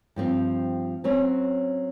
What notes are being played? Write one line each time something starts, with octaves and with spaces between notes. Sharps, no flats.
G2 F3 C4
F#3 C4 C#4 C#5